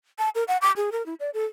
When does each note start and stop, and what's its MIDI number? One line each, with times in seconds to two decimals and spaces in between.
0.19 0.29 81
0.35 0.44 70
0.48 0.57 78
0.62 0.72 86
0.76 0.90 68
0.92 1.05 70
1.06 1.14 64
1.20 1.30 74
1.34 1.45 69